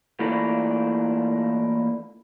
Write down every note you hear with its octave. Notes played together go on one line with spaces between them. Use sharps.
E3 A3 A#3 D4 E4 F4